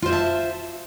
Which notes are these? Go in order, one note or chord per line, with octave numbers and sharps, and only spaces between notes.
F4 C5 E5 A5